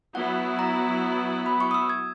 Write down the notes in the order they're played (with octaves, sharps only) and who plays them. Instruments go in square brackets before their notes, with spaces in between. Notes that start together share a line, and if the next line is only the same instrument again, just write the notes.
[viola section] F#3 B3 E4 [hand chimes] F#5
[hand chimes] A#5
B5
C#6
D#6
E6
G#6